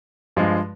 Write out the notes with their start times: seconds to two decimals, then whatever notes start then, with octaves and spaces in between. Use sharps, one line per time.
0.36 G2 F3 G#3